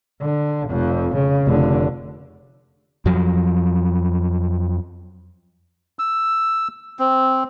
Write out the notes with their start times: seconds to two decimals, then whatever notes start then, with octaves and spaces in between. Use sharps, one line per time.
0.21 D3
0.69 F1 F2
1.15 C#3
1.47 F1 D3
3.06 F2 F3 F#3
5.99 E6
6.99 C4